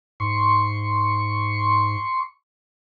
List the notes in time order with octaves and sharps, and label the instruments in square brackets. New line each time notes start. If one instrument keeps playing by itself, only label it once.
[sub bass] G#2 [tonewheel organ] C6 C#6